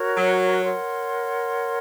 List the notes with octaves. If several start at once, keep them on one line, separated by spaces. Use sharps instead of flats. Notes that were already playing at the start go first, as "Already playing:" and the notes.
Already playing: F#4 A#4 C#5
F#3
A#4 C#5 F#5 C6